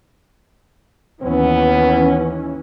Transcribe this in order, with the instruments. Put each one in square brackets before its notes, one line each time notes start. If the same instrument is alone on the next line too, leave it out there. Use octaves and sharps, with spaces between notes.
[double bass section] D#2 E3 C#4 [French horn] B3